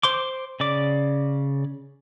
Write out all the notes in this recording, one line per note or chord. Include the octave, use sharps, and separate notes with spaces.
C5 C6 D6
C#3 D5 D6